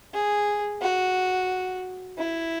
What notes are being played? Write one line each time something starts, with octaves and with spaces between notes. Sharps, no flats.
G#4
F#4
E4